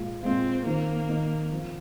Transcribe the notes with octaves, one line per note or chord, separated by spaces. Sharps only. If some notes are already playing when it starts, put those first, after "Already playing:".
Already playing: A#2 G#3 F4
A#2 G#3 C4 F4
D#3 A#3 C4 D#4
D#3 C4 D#4
F3 C4 F4